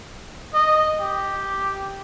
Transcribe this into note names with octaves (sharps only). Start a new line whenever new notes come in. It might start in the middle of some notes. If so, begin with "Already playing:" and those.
D#5
G4